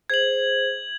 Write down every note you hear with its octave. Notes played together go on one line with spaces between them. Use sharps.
G#4 C5 G#6 F#7